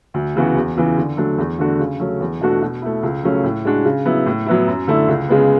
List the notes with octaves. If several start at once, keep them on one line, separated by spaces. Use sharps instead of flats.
D2
C#3 E3 B3 F#4
E2
C#3 E3 B3
D3
F#3 A3 D4
E2
D3 A3 D4 F#4
C#3
F#3 A3 C#4
E2
B2 A3 D4 F#4
B2
A3 E4
C#2
C#3 F#3 A3 C#4
A2
G#3 D4 F#4
C#3
F#3 B3 E4
A2
F#3 B3 E4
F#2
D3 A3 E4
C#2
C#3 G#3 B3